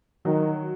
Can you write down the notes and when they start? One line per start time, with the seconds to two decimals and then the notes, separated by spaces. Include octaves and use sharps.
0.25 D#3 F#3